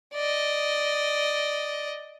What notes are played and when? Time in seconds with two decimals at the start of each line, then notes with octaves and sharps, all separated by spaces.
0.14 D5 D#5